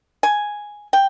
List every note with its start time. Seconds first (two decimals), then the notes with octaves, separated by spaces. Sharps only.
0.23 G#5
0.93 G5